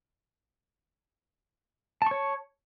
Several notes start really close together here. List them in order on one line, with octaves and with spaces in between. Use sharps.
A5 C#6 C#5